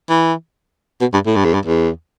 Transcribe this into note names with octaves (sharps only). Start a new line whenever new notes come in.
E3
B2
G2
A2
G2
E2
G2
E2